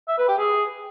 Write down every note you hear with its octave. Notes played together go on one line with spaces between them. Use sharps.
E5
B4
G4
G#4